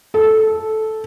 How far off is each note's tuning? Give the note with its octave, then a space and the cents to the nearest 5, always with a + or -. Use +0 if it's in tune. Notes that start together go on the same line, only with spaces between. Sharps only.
A4 -10